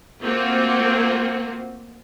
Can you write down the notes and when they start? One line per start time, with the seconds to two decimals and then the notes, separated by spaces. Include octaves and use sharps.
0.22 A3 A#3 C4 F4 F#4